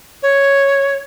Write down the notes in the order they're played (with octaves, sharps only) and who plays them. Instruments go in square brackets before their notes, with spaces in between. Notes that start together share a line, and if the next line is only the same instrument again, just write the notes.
[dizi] C#5